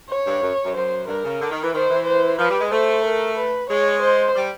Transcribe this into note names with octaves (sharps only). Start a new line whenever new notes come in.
C#5
G2
F#2
F#2
F#2 C5
G2 A#4
C#3
D3
D#3
E3
D#3 C5
E3
C5
F3 B4
G3
G#3
A3 C5
A#4
B4
G#3 C#5
C5
G3